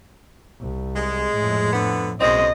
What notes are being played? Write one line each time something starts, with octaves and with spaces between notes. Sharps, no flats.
C2
G#3
F2 A2
D3 B3
B1 F#2 G#3 C4 D#5